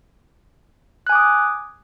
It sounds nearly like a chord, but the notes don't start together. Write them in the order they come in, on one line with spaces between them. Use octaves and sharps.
F#6 G#5 D6 D#6